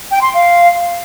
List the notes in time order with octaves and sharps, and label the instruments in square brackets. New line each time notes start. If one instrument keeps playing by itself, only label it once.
[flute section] G5
C6
F5